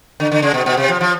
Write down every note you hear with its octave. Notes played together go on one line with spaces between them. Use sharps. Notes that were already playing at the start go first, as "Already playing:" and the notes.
D3
D3
C#3
B2
B2
C3
F3
F3